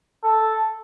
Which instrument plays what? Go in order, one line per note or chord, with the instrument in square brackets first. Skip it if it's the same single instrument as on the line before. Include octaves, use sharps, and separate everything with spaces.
[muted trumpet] A4